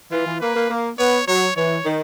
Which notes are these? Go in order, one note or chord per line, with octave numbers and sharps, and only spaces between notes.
E3 F4
E3
A#3 B4
A#3
A#3
B3 C#5
F#3 C#5
E3 C#5
D#3